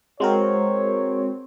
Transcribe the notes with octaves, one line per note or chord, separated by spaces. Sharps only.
G#3 C4 F#4 A#4 C#5